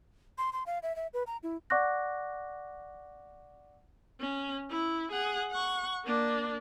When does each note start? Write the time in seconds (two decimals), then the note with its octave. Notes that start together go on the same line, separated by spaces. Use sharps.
0.38 C6
0.53 C6
0.66 F5
0.83 E5
0.96 E5
1.14 B4
1.27 A#5
1.43 E4
1.70 D5 F#5 C#6 D6 F#6 A#6
4.20 C#4
4.70 E4
5.11 G#4 F#5
5.51 F#5 C#6
6.05 A#3 D4